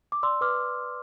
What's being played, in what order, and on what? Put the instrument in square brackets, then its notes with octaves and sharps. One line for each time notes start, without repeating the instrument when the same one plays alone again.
[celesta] D6
D5 C6 E6
B4 D6 F6